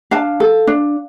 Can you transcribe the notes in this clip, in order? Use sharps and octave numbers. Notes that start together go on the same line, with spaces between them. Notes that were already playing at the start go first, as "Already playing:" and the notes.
D4 F5 A5
A4
D4